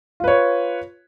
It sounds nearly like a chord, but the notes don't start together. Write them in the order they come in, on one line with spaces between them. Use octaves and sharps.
F4 B4 C#5